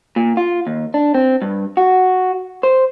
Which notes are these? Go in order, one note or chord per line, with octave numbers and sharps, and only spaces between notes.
A#2
F4
D#2
D4
C4
G2
F#4
C5